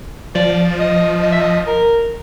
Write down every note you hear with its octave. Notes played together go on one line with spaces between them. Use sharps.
F3 D5
D#5
D#5
E5
D#5
A#4